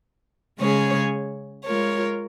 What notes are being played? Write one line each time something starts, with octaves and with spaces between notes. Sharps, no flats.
C#3 G#3 C#4 G#4 C#5
G#3 F4 A#4 C#5